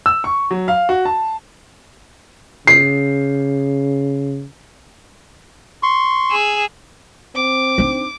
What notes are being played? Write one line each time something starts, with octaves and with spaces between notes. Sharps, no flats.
E6
C#6
F#3
F5
F#4
A5
C#3 C7
C6 C#6
G#4 E6
C4 D6
D4 D#4